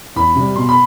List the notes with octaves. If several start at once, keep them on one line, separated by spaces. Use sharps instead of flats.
E2 B5
C3 G3
B2 C6
B5